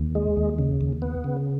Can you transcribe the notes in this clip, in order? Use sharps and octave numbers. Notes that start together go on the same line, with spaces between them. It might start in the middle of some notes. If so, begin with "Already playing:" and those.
Already playing: D#2
G#3
D#2
C#3
D#2
B3
C#3